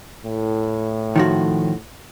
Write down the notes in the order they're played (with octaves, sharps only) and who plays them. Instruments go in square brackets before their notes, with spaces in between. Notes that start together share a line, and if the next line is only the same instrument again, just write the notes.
[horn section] A2
[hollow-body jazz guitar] D#3 F3 F#4